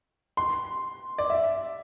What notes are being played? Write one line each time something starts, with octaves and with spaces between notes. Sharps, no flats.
C6
D5
E5